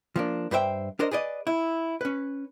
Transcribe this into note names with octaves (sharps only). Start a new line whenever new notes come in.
F3 A#3 D4
G2 B4 C5 E5 G5
D4 A#4 C5 D#5
G#4 B4 D5 D#5
E4
C#4 B4